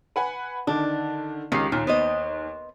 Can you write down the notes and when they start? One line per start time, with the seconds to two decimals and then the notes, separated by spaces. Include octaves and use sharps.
0.16 B4 F#5 G#5
0.67 D3 D#3 D4
1.52 C#2 D#3 G4 C7
1.72 D#2 A#2
1.87 B3 C5 D#5